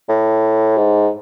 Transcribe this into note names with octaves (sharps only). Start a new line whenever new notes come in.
A2
G#2